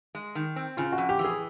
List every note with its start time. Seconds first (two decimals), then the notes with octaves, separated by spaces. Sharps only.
0.15 G#3
0.35 D#3
0.56 C4
0.77 C#3 F4
0.92 F#4
0.98 F2
1.09 G4
1.19 E3
1.25 G#4